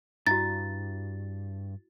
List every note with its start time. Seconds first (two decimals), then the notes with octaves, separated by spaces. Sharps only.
0.27 G2 E4 F#4 A6